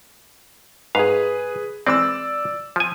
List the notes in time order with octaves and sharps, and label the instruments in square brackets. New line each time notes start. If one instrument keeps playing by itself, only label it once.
[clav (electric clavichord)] G#2 F5 [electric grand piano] G#4 B4
[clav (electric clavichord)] E3 G#3 C4 [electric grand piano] D5 E6
[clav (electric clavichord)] F3 G#5